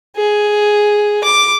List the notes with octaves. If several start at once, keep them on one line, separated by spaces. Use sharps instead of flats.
G#4
D6